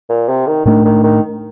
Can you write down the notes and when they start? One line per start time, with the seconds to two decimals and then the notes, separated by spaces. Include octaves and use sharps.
0.09 A#2
0.29 C3
0.47 D#3
0.65 A2 D#3 A3 D4
0.85 D#3
1.03 D#3